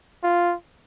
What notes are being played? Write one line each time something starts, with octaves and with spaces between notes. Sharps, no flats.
F4